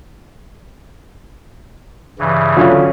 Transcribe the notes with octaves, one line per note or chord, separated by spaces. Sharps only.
G2 C#3 E3
D3 F#3 C#4 F4